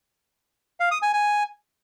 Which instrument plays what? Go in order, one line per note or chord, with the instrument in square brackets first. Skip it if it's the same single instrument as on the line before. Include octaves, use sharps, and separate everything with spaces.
[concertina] F5
D#6
G#5
G#5